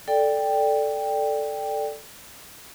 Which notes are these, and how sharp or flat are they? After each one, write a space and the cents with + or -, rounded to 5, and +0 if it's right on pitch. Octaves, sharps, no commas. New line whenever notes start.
A4 +0 D5 +0 G5 +5